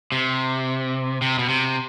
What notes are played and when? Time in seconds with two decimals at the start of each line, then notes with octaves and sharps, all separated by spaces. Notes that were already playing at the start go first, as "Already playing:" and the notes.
0.12 C3
1.22 C3
1.39 B2
1.49 C3